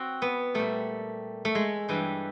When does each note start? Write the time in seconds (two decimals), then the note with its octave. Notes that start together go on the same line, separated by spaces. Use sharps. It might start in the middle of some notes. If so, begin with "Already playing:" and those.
Already playing: C4 F#4
0.22 B3
0.54 A#2 G3 A3
1.45 A3
1.55 G#3
1.89 G2 E3 G3